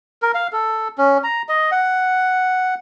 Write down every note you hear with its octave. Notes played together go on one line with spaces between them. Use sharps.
A#4
F5
A4
C#4
A#5
D#5
F#5